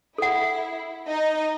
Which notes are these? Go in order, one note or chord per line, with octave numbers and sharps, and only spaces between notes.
E4 A4 F#5
D#4 D#5